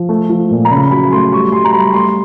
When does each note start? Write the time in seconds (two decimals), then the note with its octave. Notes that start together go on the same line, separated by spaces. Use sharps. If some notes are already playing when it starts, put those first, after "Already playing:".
Already playing: F3
0.09 A3
0.29 F3
0.51 A#2
0.65 A#5
0.70 C#3 B5
0.91 F#3 B5
1.11 A3 C6
1.32 G3 C#6
1.52 G3 C6
1.65 A#5
1.73 G3 B5
1.93 A3 C6